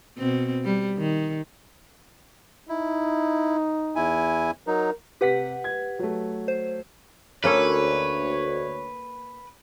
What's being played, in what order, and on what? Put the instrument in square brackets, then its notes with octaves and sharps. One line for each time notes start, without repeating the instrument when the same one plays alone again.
[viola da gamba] B2 C4
G3
D#3
[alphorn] D#4 [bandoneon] E4
[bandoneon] E2 E4 G#5
[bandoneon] F#3 D#4 [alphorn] A#4
[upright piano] C3 B6 [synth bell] G4 B4 F#5
[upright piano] G#6
F#3 A3
[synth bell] C5
[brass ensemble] D2 C#5 [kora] A#3 C#4 A4 [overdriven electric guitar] B4